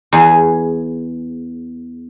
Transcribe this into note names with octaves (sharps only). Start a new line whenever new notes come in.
E2 G#4